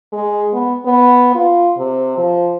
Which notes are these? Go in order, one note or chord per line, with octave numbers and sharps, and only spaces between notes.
G#3
B3
B3
F4
C3
F3